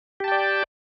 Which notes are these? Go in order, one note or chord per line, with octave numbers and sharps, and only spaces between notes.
G4 D5 G5 A5